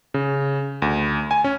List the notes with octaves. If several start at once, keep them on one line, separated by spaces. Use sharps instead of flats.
C#3
D2
G#5
C#4